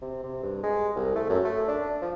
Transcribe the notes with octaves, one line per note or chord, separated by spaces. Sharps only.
C3
C3
G2
G#3
C2
A3
F#2
A3
D4
F3